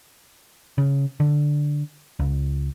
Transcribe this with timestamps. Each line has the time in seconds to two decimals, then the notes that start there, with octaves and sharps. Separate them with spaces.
0.78 C#3
1.20 D3
2.19 C#2